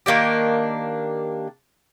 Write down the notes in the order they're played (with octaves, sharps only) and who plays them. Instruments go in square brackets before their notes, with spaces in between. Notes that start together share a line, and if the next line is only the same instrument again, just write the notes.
[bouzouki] D#3 A#3 D4 G4